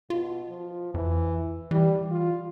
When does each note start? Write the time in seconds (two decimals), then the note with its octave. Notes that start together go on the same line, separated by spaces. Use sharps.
0.10 B2 F4
0.48 F3
0.94 F2 E3
1.71 E3 G3
2.11 F4